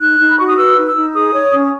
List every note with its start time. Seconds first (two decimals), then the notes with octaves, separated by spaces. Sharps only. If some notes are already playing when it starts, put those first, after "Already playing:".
0.01 D#4 F#6
0.20 D#4
0.28 B5
0.38 F#4 C#6
0.48 D#6
0.58 B4 E6
0.77 D#4
0.86 E6
0.96 D#4
1.14 G#4 D#6
1.34 C#5
1.52 C#4